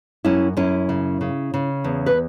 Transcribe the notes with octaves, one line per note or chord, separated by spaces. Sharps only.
F#2 C#4 E4
F#2 C#4 E4
C#3
C#3
C#3
E2
B4